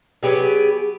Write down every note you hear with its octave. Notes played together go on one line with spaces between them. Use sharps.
F#3 B3 G4 G#4